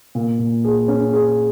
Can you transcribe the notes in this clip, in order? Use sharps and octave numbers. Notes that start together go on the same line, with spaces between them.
A#2
A#2
G#4
C#4
G#4